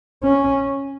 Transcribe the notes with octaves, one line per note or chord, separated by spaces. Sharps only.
C#4